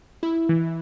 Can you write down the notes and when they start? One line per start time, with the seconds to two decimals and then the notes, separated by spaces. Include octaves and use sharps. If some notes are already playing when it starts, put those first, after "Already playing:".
0.23 E4
0.49 E3